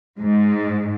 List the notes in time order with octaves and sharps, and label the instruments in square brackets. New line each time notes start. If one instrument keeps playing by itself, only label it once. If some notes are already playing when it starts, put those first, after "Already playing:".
[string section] G#2